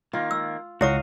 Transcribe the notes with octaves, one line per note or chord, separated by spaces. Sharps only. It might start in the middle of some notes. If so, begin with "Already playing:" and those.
D#3 A#3 F4
E6
C#2 E4 F#4 C#5 D#5 F5 D6